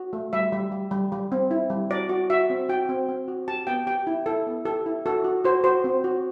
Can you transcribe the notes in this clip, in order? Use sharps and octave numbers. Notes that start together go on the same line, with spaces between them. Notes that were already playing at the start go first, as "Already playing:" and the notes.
Already playing: F#4
A3
G3 E5
G3
G3
G3
G3
C4
E4
G3
F#4 D5
F#4
F#4 E5
C4
F#4 G5
C4
C4
F#4
G4 A5
B3 G5
G4 G5
E4
E4 A4
B3
G4 A4
E4
F#4 A4
F#4
F#4 C5
F#4 C5
C4
F#4